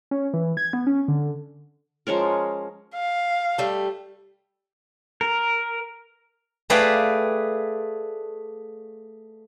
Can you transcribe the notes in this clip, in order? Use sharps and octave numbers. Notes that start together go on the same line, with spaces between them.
C#4
E3
G#6
B3
C#4
D3
F3 G#3 C#4 A#4
F5
G3 A3
A#4
A3 G#4 B4 D5 F5 G5